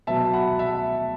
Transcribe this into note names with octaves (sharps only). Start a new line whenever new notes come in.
B2 F#3 B3 E5 A5
F#5 B5
E5 A5